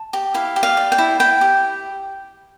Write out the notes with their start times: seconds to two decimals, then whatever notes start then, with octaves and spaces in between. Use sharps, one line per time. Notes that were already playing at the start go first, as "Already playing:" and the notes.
Already playing: A5
0.13 G4
0.34 E4 F5
0.56 G4
0.63 F5
0.77 D5
0.92 G5
0.98 E4
1.20 E4 G5
1.41 G4